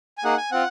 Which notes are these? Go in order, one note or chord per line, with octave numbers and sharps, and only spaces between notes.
G#5
A#3 D#4 G#4 F#5
G#5
C4 F4 F#5